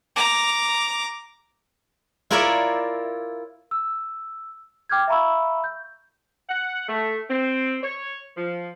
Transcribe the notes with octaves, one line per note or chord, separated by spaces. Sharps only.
A#5 D6
E4 F4 A#4 C#5 D5 E5
E6
G5 D6 F6 G6 G#6
E5 F5 A#5 B5 C#6 E6
G6
F#5
A3
C4
C#5
F3